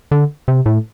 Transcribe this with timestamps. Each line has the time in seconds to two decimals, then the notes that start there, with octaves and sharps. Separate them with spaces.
0.11 D3
0.48 C3
0.66 A2